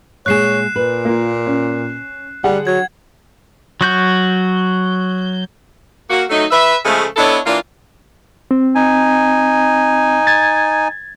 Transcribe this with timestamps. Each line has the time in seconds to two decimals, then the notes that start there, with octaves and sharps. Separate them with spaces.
0.26 A#2 G#3 G#4 C#5 F#6 C7 E7
0.76 A#2 B4
1.05 A#3 F4
1.47 C#4
2.44 D3 G3 G#4 F#5
2.67 F#3 G#6
3.81 F#3 F#4 G6
6.10 A#3 F#4
6.30 F#3 A3 D#4
6.51 B4 E5
6.85 C#3 F3 G#3 A3
7.16 B3 D4 E4 A4 C#5 D#5
7.46 E3 A#3 D4 F4
8.51 C4
8.75 D#4 G#5
10.27 G#6 A6